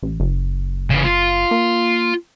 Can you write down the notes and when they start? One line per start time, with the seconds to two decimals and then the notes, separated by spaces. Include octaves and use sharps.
0.03 A1
0.20 F#1
0.90 C#3 E3
1.04 F4
1.51 A#3